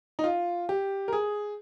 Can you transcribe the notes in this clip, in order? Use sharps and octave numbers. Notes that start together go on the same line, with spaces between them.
D#4
F4
G4
A#4
G#4